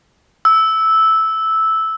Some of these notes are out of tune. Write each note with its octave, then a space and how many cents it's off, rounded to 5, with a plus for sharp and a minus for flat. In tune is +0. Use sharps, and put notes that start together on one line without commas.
E6 -10